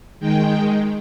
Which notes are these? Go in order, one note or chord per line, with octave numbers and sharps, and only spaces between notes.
D#3 G#3 G5